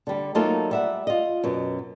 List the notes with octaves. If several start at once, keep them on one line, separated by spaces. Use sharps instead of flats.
D3 G3
F#3 A3 A#3 D#4 F4 A4
G3 E5 F#5
F4 D#5
F#2 B2